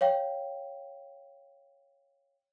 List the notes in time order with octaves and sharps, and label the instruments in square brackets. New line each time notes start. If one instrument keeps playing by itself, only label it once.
[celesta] C#5 F5 G5